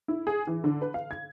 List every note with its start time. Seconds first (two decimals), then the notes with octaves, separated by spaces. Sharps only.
0.08 E4
0.27 G#4
0.47 E3
0.64 D3
0.82 B4
0.94 F5
1.11 G#6